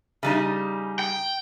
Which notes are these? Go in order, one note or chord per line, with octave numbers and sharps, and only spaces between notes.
C#3 G3 D#4
G5